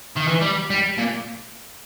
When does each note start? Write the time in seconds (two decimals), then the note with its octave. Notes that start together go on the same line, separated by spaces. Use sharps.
0.17 D#3
0.28 E3
0.42 G3
0.70 G3
0.98 A#2